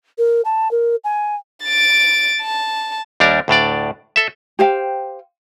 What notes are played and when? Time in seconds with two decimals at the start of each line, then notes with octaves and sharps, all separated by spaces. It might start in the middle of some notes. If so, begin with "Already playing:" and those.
0.18 A#4
0.45 A5
0.71 A#4
1.04 G#5
1.64 A6 D7
2.41 A5
3.20 D#2 G3 D4 A#4
3.48 D2 A2 D4 D5
4.16 A4 E5
4.59 G4 C5 F5 G5